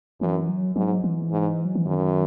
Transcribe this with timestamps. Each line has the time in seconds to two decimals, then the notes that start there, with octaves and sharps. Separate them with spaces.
0.21 F#2 E3
0.49 F#3
0.76 G#2 F#3
1.04 E3
1.32 G#2
1.65 F#3
1.75 E3
1.86 F#2 D#3